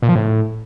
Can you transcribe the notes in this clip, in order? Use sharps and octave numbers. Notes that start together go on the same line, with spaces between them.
A#2
F3
A2